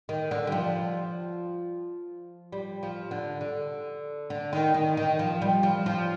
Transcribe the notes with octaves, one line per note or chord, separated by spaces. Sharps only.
D#3
D3
G3
F3
G3
F3
D3
D3
D3
D#3
D#3
D#3
F3
G3
F3
F3